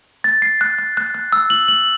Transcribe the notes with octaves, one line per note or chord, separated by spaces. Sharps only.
A6
C7
F#6
F#6
F#6
F#6
E6
F#7
F#7